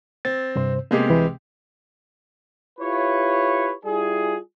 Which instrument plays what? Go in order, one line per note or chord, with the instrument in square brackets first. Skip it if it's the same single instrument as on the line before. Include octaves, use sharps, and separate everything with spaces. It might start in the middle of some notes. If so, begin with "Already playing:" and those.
[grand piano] C4 [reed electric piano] A6
[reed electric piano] G2 C3 C5
[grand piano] C3 G#3 G4 [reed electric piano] A#3 B3 C#4
[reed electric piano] C2 E3 B4
[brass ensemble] E4 F4 G4 B4 C#5
G3 E4 F4 G#4